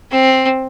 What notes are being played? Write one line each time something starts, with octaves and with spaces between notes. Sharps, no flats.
C4